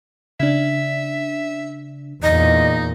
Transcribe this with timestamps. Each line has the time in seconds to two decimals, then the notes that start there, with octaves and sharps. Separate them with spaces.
0.40 C#3 D4 E5
2.23 E2 A#2 D#4 D#5